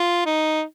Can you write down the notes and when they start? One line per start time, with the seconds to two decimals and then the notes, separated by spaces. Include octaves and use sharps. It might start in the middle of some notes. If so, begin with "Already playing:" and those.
Already playing: F4
0.26 D#4